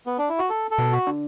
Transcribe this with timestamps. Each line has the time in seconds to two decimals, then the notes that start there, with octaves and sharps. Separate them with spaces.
0.07 B3
0.18 D4
0.29 E4
0.39 F#4
0.49 A4
0.71 A4
0.78 B2
0.92 F#4
1.07 D3